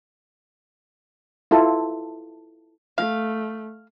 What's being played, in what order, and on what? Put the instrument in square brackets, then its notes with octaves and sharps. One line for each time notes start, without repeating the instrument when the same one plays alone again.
[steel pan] E4 F4 A4
[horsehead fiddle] A3 [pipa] F5